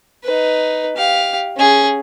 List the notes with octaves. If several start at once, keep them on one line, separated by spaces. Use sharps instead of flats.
D#4 B4
G4 F5
C#4 G#4